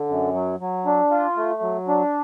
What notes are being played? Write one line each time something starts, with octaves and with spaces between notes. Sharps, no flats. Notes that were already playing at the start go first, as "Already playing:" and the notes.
Already playing: D3
F#2
F#3
F#3
D4
F4
A3
F#3
D4